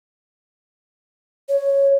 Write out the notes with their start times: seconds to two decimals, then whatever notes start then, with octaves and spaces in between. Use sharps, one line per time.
1.49 C#5